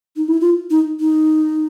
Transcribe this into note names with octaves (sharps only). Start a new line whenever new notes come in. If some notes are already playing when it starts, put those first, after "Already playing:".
D#4
E4
F4
D#4
D#4